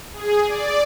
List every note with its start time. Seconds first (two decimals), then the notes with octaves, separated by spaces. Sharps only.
0.13 G#4
0.46 D5